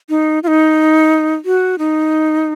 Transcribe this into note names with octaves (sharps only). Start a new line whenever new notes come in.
D#4
F4
D#4
F#4
D#4